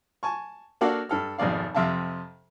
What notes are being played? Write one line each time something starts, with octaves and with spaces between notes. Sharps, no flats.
G#5 A5 C#6
A#3 D4 F#4 A4 D5 F5
G2 A4 F6
G#1 F2 B2 D5 F5
F2 C3 E5 F5 A5